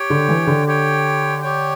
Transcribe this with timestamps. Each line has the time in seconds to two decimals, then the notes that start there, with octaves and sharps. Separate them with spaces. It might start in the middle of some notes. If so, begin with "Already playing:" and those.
Already playing: G4 C#5 G5
0.10 D3
0.28 E3
0.47 D3
0.67 G4 C#5 G5
1.42 G4 C#5 G5